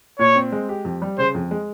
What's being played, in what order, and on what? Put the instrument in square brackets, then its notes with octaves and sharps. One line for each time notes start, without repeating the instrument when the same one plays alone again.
[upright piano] A#2 [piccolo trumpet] C#5
[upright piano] C4
G#3
G4
F2
G3
[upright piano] C#3 [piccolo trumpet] C5
[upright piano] F2
G#3